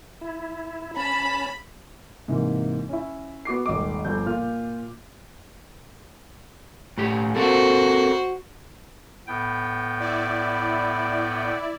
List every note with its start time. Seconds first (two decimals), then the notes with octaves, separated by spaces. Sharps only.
0.21 E4
0.97 C#4 A5 B5
2.28 G#2 C3 E3 A#3
2.89 C#4 E4
3.45 B3 F#4 D6 C7
3.66 D#1 G#1 D#5 D6
4.05 G1 F3 G6
4.26 A#2 F4 F6
6.98 A2 G4
7.36 C4 F#4 A4 A#4 C5
9.27 A2 B3 G5
10.00 E4 D5